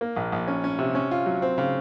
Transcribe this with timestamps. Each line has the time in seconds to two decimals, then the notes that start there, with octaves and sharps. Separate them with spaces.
0.01 A#3
0.16 A#1
0.32 A#1
0.47 C#4
0.64 C#4
0.79 C3
0.95 C#4
1.11 F4
1.26 F#3
1.42 C4
1.58 C#3